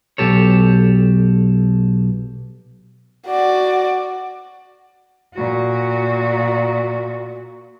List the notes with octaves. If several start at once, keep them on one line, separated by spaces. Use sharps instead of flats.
B1 G4 A4 C#5
F#4 D5
A#2 F#4